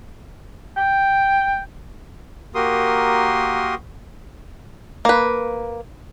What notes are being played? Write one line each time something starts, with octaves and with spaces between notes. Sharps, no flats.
G5
A#3 F#4 G4 A#4 C6 D#6
A#3 B4